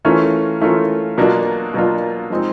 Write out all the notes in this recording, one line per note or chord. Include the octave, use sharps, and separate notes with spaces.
E3 A3 C#4 F4 A#4
E3 A3 C#4 F4 A#4
B2 F#3 A#3 D4 F4
B2 F#3 A#3 D4 F4
F3 G#3 C4 D#4